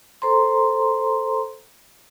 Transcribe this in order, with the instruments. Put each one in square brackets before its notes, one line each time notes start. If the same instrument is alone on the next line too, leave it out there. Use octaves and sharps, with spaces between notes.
[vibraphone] A4 C5 A#5 C6